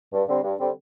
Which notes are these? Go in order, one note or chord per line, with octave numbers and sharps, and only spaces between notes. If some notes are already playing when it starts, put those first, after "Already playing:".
G2
D3 G3 C4
G2
D3 G3 C4